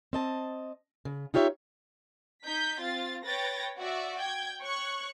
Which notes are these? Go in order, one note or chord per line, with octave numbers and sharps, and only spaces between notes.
C4 D#5 A5
C#3
D#4 F4 G4 C#5 E5
D#4 G6 B6
C4 F4 A6
B4 C#5 G5 A6 A#6
F#4 D5 E5
G5 G6 G#6
C#5 C#6 F#6